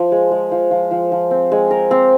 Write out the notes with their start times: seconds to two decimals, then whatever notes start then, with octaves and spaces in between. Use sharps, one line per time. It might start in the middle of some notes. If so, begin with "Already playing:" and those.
Already playing: F3
0.12 G#3
0.31 G#3
0.51 F3
0.71 F3
0.91 F3
1.12 F3
1.31 C4
1.52 G#3
1.71 A#4
1.91 C4